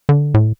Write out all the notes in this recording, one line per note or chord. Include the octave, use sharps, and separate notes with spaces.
D3
A2